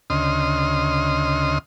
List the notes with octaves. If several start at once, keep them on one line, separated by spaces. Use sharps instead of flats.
D2 C#3 D#5 C6 D#6 F6